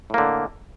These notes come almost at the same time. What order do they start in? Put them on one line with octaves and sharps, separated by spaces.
A2 A#3 D3